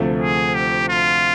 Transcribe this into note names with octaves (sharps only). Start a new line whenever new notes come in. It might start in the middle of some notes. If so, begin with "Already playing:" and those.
Already playing: D2 C3 F3 A3
G#4
G4
F4